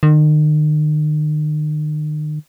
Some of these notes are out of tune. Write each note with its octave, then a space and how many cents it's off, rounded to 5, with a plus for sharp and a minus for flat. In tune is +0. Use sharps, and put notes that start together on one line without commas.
D#3 -40